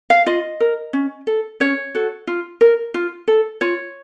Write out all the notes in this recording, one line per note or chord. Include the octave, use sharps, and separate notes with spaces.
F5
F4 D#5
A#4
C#4
A4
C#4 C#5
F#4 A4
F4
A#4
F4
A4
F4 C#5